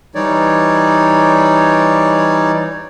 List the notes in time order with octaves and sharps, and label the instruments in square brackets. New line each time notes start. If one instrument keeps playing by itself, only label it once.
[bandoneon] E3 G3 D#4 C#5 D5